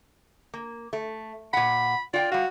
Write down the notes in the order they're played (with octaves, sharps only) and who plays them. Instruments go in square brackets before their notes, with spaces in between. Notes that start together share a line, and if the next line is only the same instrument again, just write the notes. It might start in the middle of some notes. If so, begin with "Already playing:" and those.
[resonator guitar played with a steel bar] A#3
A3
[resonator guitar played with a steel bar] A#2 F#5 [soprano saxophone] B5
[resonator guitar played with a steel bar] F4 F#5 G5 [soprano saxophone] D5
[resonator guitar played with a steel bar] G3 F5 [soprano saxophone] F#4